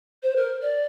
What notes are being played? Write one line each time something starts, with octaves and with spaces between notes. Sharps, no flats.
C5
A#4
D5